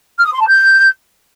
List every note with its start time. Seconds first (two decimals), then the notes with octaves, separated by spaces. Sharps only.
0.18 F6
0.25 D#6
0.32 C6
0.40 A5
0.47 G6